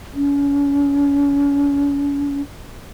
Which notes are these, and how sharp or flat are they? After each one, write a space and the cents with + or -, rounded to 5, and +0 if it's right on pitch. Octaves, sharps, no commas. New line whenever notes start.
C#4 +35